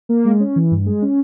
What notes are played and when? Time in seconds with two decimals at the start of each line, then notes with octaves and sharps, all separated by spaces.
0.09 A#3
0.25 G#3
0.40 C#4
0.56 E3
0.71 G2
0.86 G#3
1.02 C#4